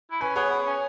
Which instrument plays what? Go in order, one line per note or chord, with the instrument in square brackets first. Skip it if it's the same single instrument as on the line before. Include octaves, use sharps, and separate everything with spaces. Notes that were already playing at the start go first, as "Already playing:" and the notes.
[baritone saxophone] E4
[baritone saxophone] C#4 [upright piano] B4
[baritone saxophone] B3 [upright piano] G#4 C#5
[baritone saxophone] B3
C#4